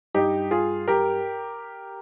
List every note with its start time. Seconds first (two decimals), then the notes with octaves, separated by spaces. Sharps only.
0.15 G2 G3 D#4 G4
0.51 F4 G#4
0.88 G4 A#4